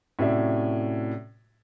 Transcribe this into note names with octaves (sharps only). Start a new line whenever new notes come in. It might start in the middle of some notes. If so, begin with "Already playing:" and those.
A2 C3 C#4 F#4 D5 E5